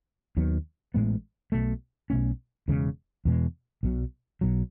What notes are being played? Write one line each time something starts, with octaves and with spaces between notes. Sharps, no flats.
D#2 D#3 F#3 B3
A1 A2 G#3 B3
B1 B2 A3
B1 B2 A3 C#4
E1 E2 C#3 G#3
E2 B2 G#3
B1 B2 F#3
B1 B2 F#3